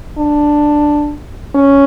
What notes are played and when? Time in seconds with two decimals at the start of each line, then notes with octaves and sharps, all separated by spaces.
0.18 D4
1.55 C#4